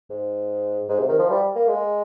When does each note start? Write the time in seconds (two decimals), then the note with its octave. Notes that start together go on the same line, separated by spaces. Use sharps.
0.10 G#2
0.89 G#2
0.99 C3
1.09 D#3
1.19 F3
1.30 G3
1.56 A#3
1.68 G#3